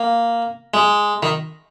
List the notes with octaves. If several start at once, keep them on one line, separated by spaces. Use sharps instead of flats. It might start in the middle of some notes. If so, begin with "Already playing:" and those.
Already playing: A#3
G#3
D#3